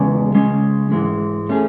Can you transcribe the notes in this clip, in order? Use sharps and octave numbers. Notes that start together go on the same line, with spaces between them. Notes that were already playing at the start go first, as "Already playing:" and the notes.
Already playing: E2 C#3 G#3 C#4
C#3 G#3 C#4
G#2 E3 G#3
A3 C#4 G#4